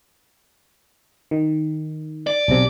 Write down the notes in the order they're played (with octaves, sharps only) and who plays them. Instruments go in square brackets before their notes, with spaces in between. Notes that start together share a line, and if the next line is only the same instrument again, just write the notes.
[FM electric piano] D#3
[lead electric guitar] D5
[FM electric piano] B1 C3